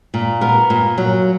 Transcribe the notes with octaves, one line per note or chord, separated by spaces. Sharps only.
A#2
B3 A#4
A#2
F#3